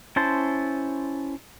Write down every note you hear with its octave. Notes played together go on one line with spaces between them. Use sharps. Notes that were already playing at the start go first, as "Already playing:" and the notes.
C#4 E4 C5 A5 C6